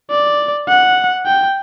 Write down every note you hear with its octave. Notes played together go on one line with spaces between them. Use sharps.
D5
F#5
G5